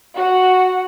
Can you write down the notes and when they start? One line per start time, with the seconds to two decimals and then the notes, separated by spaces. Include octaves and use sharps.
0.17 F#4 F#5